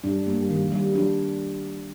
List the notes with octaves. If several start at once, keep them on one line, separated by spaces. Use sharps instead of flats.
G2 G3 D4
A#3
D#3
G3
F#3 D4